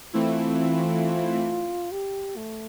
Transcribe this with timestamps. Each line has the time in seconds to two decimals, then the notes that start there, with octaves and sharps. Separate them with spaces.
0.13 E3 A3 C4 E4 F4
1.92 G4
2.37 A3